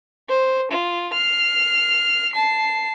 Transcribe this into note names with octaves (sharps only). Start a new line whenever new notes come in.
C5
F4
F6 C7
A5 C7